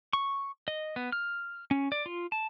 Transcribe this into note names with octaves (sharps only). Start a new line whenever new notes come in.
C#6
D#5
B3
F6
C#4
D5
F4
A5